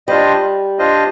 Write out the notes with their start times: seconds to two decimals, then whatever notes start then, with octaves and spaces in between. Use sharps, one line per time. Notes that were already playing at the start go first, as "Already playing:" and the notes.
0.08 G3 D4 F4 C5 D#5
0.79 D4 F4 C5 D#5